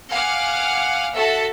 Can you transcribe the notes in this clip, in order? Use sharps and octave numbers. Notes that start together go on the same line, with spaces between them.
F5 F#5 G#5 D6 F6
F#4 A4 E5 A5